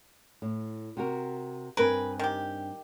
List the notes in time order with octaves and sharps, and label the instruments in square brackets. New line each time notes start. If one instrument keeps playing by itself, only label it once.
[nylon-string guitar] A2
C3 F#4 A#4
[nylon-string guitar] G2 C4 G#5 [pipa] A#4 B4
[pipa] D#3 G4